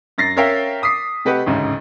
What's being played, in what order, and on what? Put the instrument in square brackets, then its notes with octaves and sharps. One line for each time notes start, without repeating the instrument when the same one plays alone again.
[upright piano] F#2 A6 A#6 C7
C#4 A#4 C#5 E5 F5 G5
D6 D#6 B6 C7
C3 A3 G4 B4 D#5 F#5
A1 D2 G#2 C#3